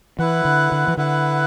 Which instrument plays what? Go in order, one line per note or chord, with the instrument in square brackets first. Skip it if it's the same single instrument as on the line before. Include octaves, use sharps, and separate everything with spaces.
[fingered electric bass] E3 [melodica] E4 B4 F#5
[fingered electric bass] D3
D3
E3
[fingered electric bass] D3 [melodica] E4 B4 F#5